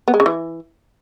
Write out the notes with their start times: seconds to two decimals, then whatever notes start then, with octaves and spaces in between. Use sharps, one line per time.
0.08 B3
0.14 G#3
0.20 C#3
0.26 E3